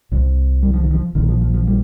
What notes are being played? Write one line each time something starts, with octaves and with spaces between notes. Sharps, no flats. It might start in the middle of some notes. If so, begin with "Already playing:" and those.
C2 C3
G3
F3
D#3
F3
A#1 A#2 D#3
F3
F3
F3
G3